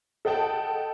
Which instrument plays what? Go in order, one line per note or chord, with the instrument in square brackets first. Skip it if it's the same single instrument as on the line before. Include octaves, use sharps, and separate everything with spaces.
[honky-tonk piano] A4 D#5 F#5 G5 A5